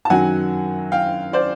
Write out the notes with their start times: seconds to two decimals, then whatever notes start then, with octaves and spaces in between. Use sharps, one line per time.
0.05 A5
0.10 F#2 D#3 F#3 F#5 G#5
0.92 F5 G5
1.33 C5 D5